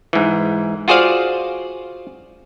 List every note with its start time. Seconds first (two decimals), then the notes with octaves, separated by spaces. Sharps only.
0.13 G#2 E3
0.88 F4 F#4 G#4 C5 D5 F5